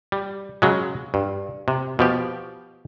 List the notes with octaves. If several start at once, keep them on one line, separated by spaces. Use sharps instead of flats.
G3
C#3 F#3 G#3
G2
C3
B2 F3 G4